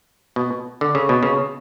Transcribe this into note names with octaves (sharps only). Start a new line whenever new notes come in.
B2
D3
C#3
B2
C#3